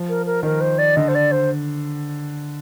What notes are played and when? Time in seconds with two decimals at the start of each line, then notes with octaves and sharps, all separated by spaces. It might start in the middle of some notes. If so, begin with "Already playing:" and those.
Already playing: F3
0.09 A#4
0.26 A#4
0.43 D#3 A#4
0.61 C5
0.78 D5
0.96 D3 D#5
1.08 C5
1.15 D5
1.31 C5